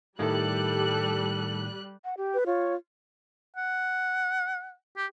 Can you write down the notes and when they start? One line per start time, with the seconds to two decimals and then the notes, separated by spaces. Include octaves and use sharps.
0.19 A2 D#3 G3 A3 G4 A4 F#6
2.04 F#5
2.17 G4
2.34 B4
2.46 F4 C#5
3.56 F#5
4.97 G4